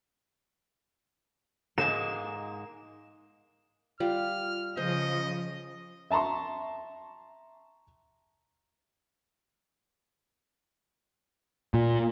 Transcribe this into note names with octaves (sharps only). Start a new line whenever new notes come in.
G#2 G#3 A#3 E7
G3 F4 F6
C#3 F3 C5 D#5
E5 A5 A#5 C6 C#6
A#2